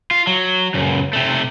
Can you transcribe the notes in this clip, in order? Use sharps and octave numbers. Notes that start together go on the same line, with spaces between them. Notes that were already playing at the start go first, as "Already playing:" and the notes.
F4
F#3
C#2 F#2
C3 A3